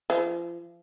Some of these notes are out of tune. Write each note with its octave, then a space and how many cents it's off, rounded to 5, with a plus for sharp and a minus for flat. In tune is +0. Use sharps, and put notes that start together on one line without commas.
F3 -35